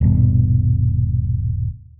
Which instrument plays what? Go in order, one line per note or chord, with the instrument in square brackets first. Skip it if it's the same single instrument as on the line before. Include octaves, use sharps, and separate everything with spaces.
[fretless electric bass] D#1 G2 B2